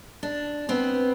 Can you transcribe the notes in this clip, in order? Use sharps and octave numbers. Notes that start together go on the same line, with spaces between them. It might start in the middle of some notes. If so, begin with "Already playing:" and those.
D4
B3 C4